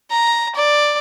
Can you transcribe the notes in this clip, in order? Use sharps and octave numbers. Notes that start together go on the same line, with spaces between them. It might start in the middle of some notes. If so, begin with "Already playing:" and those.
A#5
D5